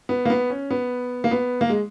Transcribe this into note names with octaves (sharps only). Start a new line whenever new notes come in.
B3
A#3
B3
C#4
B3
A#3
B3
A#3
G#3